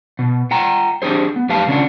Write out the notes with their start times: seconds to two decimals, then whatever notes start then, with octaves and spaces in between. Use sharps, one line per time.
0.19 B2
0.51 F4 F#5 G5 A#5
1.02 D4 G4 G#4 C5
1.36 B3
1.49 F2 G4 B4 F5 A5
1.68 C#3 C#4 D4 F4 F#5